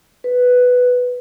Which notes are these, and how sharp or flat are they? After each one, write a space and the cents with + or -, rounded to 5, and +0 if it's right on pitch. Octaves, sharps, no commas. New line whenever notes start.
B4 +5